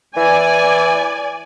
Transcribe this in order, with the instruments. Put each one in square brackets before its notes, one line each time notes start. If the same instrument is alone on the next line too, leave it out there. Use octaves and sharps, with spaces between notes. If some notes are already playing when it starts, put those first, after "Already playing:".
[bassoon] E3 [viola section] D5 G#5